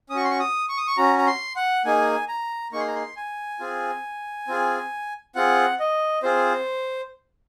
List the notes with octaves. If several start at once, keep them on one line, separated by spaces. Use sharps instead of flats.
C#4 F#4 C#6 D#6
C6
C#6
D#6
C#6
D#6
C#6
C#4 F#4 A#5
A#5
C6
F#5
A#3 D#4 G#4 G#5
A#5
A#3 D#4 G#4 C#6
C6
A#5
C6
G#5
C4 F4 G#4
C4 F4 G#4
C4 F4 G#4 F#5
D#5
C4 F4 G#4 C5